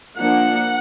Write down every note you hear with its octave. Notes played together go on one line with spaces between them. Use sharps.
F3 A#3 D4 F#5